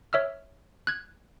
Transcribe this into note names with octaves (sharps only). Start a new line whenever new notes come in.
C#5 E5 E6 F6
F#6 G#6